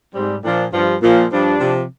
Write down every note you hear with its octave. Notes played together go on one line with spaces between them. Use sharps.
G#2 G3 C4
A#2 F3 D4
G2 F3
A#2 F3
G2 F3 D4
C3 F3